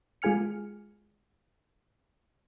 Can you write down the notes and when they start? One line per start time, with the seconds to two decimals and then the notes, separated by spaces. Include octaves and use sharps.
0.22 G#3 F4 G#4 G#5 F6 C#7